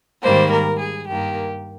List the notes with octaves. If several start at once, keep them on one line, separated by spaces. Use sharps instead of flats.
G#2 D#3 G3 A#3 C5
A#4
G#4
G2 D#3 A#3 G4